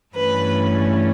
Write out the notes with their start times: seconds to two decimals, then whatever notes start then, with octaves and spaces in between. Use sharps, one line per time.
0.15 G2 E3 A3 C#4 B4